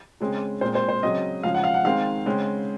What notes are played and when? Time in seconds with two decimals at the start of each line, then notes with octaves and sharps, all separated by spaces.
0.20 C#3 G#3 C4
0.61 A#2 G#3 C4 C5
0.75 C5
0.89 C5
1.03 C#3 F#3 C4 D#5
1.43 C#3 F3 G#3 F5
1.54 F#5
1.64 F5
1.74 F#5
1.84 D#3 G#3 C4 F5
2.26 C#3 G#3 C4